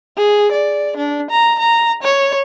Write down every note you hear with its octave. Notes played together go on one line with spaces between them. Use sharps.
G#4
D5
D4
A#5
A#5
C#5